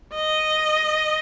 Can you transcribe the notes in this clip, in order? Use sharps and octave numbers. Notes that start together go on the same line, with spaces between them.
D#5